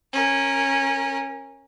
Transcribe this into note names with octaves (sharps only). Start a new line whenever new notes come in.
C#4 A#4